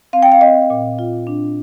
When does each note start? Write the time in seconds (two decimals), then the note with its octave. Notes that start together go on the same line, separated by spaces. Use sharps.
0.13 C4 F5
0.23 G5
0.32 F5
0.41 C4 D#5
0.70 A#2
0.99 F4
1.27 D4